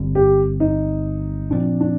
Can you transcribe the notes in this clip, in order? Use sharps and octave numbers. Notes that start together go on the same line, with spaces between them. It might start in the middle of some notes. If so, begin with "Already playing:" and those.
Already playing: G1 G2 D3 G3 C4
G4
D#4
A#2 F3 C4 D4
D4